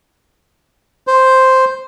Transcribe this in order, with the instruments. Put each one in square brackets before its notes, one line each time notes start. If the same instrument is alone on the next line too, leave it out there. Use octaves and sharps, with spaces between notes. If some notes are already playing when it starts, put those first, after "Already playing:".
[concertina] C5